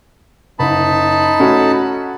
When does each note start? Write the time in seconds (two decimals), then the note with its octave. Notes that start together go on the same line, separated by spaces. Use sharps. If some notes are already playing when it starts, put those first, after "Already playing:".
0.59 F#1 D#4 A5 B5
1.39 A3 C#4 F#4